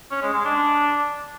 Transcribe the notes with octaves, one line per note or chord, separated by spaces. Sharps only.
C#4
G#3
G#3
D4